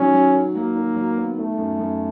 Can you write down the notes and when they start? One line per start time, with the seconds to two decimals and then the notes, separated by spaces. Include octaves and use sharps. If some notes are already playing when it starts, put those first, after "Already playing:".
Already playing: D#3 F#3 C#4
0.14 F#3
0.35 D#3
0.55 F#3 A#3
0.75 D#3
0.96 F#3
1.17 B3
1.37 D#3 A3
1.58 F#2
1.79 F#2